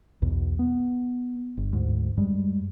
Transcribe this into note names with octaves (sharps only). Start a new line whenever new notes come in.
B1 E2 B2
B3
G1
D2 G#2
F#2 G3 G#3